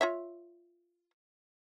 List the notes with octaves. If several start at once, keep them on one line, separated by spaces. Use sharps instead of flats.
F4 C#5 E5